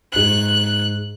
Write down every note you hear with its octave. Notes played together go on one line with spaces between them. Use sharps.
G#2 F#6 F#7